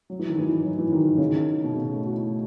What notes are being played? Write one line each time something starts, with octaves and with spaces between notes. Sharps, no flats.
F#3
E3
D#3
E3
F#3
E3
D#3
D#3
C#3
D#3
B2
C#3
A3
F#4
E4